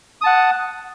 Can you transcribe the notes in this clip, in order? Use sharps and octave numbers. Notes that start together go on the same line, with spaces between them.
F#5 A5 D#6